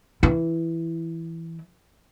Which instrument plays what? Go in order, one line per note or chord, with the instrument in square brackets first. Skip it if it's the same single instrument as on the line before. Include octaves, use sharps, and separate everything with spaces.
[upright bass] E3 E4